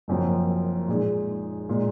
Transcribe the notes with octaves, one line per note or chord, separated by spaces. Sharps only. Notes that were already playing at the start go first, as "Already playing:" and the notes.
F#1 F#2 F3 C4
A#2 G#3 D#4 G#4
A#2 G#3